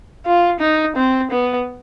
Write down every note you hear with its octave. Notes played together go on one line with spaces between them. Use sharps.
F4
D#4
C4
B3